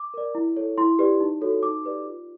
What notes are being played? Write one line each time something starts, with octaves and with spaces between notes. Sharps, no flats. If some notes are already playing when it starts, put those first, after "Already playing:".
Already playing: D6
A#4 D5
E4
A4 C#5
E4 C6
G4 B4 D5
D#4
F#4 A4 C#5
D#4 D6
G4 B4 D5
F4